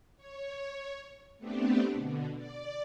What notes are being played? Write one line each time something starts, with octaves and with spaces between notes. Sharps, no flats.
C#5
A3 B3 C4 D4 G4
B2 D3
D5